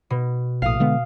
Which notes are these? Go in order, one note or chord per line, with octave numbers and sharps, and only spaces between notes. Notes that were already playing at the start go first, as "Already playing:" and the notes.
B2
A#1 A2 F5 D#6
D3 G#3 B3